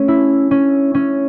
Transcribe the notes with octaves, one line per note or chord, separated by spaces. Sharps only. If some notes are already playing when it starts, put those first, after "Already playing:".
Already playing: A3 C#4
E4
C#4
C#4